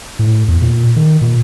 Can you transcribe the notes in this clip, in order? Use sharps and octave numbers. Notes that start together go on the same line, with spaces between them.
A2
E2
A#2
D#3
A#2